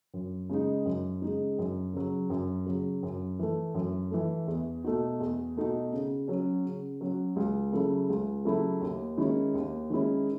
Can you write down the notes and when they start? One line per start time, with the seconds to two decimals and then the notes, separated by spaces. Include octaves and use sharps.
0.14 F#2
0.49 C#3 G#3 D#4
0.86 F#2
1.22 C#3 G#3 D#4
1.59 F#2
1.94 C#3 F#3
2.30 F#2
2.66 C#3 F#3
3.03 F#2
3.39 E3 A3
3.75 F#2
4.11 E3 A3
4.47 E2
4.84 B2 A3 D#4 F#4
5.20 E2
5.56 B2 A3 D#4 F#4
5.93 C#3
6.28 F#3 C#4 F#4
6.65 C#3
7.01 F#3 C#4 F#4
7.36 C#2
7.73 C#3 F#3 A3 E4
8.09 C#2
8.45 C#3 F#3 A3 E4
8.81 D#2
9.17 D#3 G#3 C#4 E4
9.54 D#2
9.90 D#3 G#3 C#4 E4